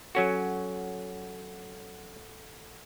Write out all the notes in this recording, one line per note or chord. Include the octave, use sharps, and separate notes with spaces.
F#3 C#4 F#4 A4 F#5